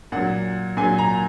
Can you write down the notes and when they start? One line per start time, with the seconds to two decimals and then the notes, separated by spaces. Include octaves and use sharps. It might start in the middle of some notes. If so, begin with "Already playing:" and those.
0.12 A#2 F#3 F#5
0.77 A#2 F#3 G#5
0.98 A#5